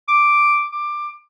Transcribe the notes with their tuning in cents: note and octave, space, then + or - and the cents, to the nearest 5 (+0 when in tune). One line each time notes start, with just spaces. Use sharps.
D6 +0
D6 +15